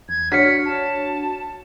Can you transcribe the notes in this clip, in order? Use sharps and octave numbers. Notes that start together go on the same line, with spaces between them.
E2 G#6
D4 F#4 C#5 F6 B6 C#7
A5